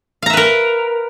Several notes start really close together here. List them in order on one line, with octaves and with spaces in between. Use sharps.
F5 A#5 E5 B4 A#4